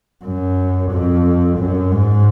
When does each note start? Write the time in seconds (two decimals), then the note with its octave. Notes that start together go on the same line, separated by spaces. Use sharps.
0.24 F#2
0.91 F2
1.58 F#2
1.92 G#2